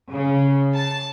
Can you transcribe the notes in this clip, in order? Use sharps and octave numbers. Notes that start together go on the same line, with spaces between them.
C#3
A5